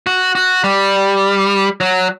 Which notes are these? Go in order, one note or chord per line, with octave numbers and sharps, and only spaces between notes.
F#4
F#4
G3
F#3